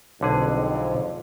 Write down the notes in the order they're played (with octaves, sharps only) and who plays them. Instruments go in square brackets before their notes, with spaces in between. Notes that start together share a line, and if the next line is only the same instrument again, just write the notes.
[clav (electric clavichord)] B1 D3 G#4 [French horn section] F2 G#2